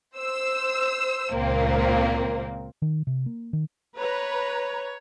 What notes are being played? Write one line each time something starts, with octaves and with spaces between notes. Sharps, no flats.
C5 E6
C#2 A#2 A#3 C4
D#3
C3
A#3
D#3
B4 C#5 A#5